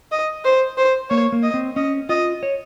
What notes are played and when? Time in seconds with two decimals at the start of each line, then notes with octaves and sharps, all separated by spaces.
0.12 D#5
0.45 C5
0.78 C5
1.10 A#3 C#5
1.32 A#3
1.43 D#5
1.54 C4
1.76 C#4 D#5
2.09 F4 D#5
2.43 C#5